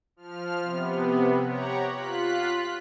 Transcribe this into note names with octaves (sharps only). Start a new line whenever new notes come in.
F3 F6
C3 B3
G4 C#5 F#5 A#5
F4 F#6 B6